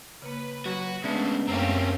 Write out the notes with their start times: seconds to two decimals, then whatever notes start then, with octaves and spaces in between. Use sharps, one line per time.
0.22 C#3 A#3 B4
0.66 F#3 F#4
1.03 C#3 G#3 A3 B3 D4 E5
1.47 F#2 A3 A#3 C4 C#4 G4